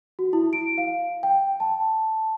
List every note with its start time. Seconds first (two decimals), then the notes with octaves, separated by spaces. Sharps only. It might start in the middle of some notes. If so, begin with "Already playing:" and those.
0.19 F#4
0.33 E4
0.53 D7
0.78 F5
1.23 G5
1.60 A5